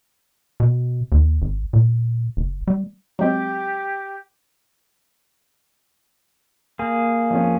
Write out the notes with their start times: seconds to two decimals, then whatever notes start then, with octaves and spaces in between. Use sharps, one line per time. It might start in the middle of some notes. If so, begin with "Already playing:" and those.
0.60 B2
1.12 D#2
1.42 G#1
1.73 A#2
2.37 F#1
2.68 G3
3.19 F#3 G#3 C4 G4
6.79 A#3 G#4
7.31 F2 F3 C#4